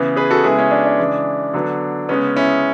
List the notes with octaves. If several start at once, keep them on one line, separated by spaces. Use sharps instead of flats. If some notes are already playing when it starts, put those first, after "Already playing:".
Already playing: C#3 E3 B3
G#4 B4
F#4 A4
C#3 G#3 B3 E4 G#4
C#4 E4
D4
D4
C#3 E3 G#3
D3 F#3 B3
C#3 G#3 B3 C#4
C#4 E4